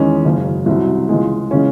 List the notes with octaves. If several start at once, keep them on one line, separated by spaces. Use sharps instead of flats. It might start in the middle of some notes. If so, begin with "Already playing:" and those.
Already playing: E2 D#3 G#3 C#4
F#1 F#2 C#3 F#3
C2 C3 F#3
C#2 C#3 E3 G#3
C#3 E3 G#3 C#4